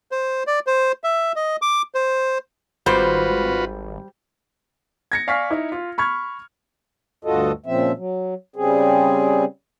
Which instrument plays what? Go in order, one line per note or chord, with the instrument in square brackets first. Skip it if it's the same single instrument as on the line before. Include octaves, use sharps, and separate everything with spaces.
[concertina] C5
D5
C5
E5
D#5
D6
C5
[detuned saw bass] G#1 [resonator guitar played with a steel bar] G3 C5 [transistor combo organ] F4 F#4 B4
[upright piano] G#6 A#6 C#7
D5 F5 G#5 C#6 F6 B6
D#4 E4
F4
B5 C#6 F6 G#6
[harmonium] D2 G2 F4 F#4 A4 D#5
A#2 C#3 F3 C4 E5
F#3
C#3 G3 C4 G#4